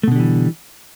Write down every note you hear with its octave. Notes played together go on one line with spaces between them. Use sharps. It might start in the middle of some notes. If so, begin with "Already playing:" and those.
B2 D3 E3 G3 A3